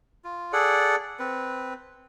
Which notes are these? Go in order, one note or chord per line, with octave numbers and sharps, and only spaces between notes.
F4
G#4 A4 D5 F#5
C4 B4